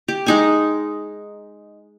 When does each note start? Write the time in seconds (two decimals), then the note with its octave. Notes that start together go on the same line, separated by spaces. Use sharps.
0.08 G4
0.26 G#3 D#4 G#5